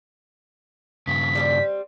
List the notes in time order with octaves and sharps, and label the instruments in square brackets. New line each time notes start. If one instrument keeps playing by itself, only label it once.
[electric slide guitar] G2 C#3 [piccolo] B6
[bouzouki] G3 A3 C4